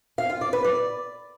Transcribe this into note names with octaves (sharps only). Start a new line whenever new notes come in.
F5
F4
D5
B4
D5